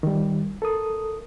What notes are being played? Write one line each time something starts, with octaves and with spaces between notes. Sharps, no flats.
D#3 G3
A4 A#4 D#6